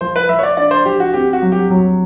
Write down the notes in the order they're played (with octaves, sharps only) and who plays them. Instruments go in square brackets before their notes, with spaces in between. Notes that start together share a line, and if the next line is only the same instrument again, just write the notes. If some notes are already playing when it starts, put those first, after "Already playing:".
[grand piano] F3 [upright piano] C5
[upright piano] B4
[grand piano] F3 [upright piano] E5
[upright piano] C#5
D5
[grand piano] D4 [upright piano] D5
[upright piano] C5
[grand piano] F3 [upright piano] G4
[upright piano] F#4
[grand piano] C4 [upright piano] G4
[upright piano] F#4
[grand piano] F#3
[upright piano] G4
[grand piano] F#3